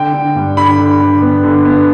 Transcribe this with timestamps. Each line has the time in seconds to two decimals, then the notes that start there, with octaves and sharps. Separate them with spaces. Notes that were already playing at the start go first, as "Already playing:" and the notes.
Already playing: D3 G5
0.13 D3
0.36 G2
0.57 D3 B5
0.78 D3
1.01 D3
1.22 B3
1.44 D3
1.65 B3